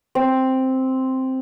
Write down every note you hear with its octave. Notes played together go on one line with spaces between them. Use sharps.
C4